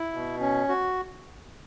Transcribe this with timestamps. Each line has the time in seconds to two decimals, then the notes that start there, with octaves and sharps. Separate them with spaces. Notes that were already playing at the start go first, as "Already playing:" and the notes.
Already playing: E4
0.13 B2
0.40 C#4
0.68 F#4